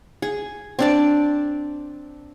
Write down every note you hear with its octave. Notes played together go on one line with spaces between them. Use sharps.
G#4
C4 D4 D5